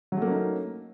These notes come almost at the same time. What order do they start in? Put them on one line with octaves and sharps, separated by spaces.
F#3 A3 A#3 C#4 D#4